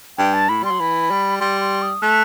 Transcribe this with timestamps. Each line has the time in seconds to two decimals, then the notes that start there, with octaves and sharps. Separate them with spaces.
0.18 G2 G5
0.34 A5
0.49 A2 B5
0.63 G3 C6
0.71 F#3
0.80 E3 B5
1.11 G3
1.40 G3 C6
1.61 C6
1.82 D#6
2.02 A3 F#6